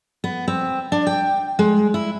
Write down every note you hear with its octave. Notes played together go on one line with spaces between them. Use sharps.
B3
C4
D4
G5
G#3
E4